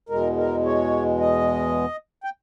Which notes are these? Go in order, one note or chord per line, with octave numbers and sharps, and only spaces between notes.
E2 B2 G#3 A#4
A#4
C#5
D#5
G5